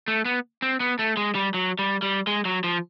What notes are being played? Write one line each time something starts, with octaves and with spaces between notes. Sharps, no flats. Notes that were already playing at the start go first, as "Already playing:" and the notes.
A3
B3
C4
B3
A3
G#3
G3
F#3
G3
G3
G#3
F#3
F3